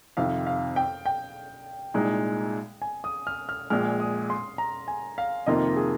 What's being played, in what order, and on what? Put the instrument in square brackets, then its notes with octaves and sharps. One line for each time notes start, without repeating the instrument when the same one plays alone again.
[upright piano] F2 C3 D#3 [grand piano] F5
[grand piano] F5
G5
G5
[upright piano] C2 A#2 G#3 D#4
[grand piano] G#5
D#6
F6
F6
[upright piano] A#1 A#2 G#3 [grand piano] F6
[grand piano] D#6
C6
A#5
G#5
F5
[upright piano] F2 C3 D#3 A#3 F4 [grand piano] D#5
[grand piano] G#4